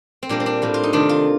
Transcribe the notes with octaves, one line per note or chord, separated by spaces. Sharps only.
C4
A#2 G3 A#3 D4
C4
D4
A2 G3 A#3
F4
D#4
C3 D#3 A3 D4
F4